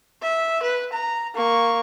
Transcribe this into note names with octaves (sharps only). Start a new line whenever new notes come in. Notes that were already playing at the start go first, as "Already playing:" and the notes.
E5
B4
A#5
A#3 C#6